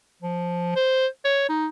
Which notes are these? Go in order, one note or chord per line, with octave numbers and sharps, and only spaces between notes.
F3
C5
C#5
D#4